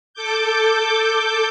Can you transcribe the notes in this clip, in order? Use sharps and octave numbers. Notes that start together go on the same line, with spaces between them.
A4 D6 G6